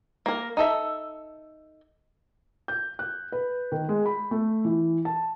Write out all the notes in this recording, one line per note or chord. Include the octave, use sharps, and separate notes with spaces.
A#3 A#4
D#4 A4 E5
G6
F#6
B4
D#3
G#3
B5
A3
E3
A5